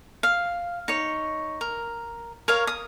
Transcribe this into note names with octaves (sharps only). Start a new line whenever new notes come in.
F5
D#4 C#5
A#4
A#4 C#5 F5
D#6